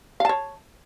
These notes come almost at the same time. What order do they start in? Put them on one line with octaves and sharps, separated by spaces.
F5 A5 C#5